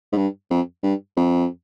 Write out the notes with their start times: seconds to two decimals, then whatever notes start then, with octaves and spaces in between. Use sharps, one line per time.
0.12 G#2
0.17 G2
0.50 F2
0.83 G2
1.16 F2